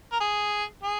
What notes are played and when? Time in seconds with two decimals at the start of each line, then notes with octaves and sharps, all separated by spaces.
0.12 A#4
0.20 G#4
0.84 G#4